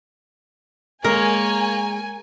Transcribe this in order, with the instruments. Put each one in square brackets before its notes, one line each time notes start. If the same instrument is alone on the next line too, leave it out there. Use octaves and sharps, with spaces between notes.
[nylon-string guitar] G#3 [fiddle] A#3 C#5 [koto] A#4 [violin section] G#5